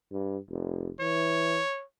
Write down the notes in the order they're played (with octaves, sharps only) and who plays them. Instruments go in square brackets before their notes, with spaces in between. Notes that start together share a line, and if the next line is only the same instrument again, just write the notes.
[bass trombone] G2
F1
[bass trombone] E3 [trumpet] C#5